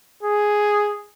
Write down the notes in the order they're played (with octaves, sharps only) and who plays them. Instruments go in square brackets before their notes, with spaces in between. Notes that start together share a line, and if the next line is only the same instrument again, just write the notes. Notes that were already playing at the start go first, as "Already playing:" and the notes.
[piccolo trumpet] G#4